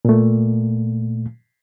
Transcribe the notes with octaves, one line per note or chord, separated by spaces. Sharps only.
A#2 A3